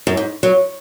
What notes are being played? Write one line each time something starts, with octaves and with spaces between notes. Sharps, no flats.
F#2
G#2
F#3